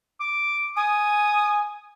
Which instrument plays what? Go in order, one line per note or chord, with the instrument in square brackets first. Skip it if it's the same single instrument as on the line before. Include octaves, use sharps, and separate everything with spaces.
[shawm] D6
[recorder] G#5 [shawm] D#6